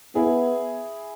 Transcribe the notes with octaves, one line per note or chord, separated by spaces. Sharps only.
B3 E4 G#4